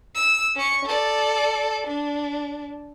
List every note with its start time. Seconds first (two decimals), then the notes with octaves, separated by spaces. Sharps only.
0.15 E6
0.56 C#4 C#6
0.85 A4 D5
1.88 D4